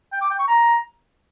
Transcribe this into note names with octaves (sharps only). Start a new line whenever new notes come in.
G5
D6
G5
C#6
A#5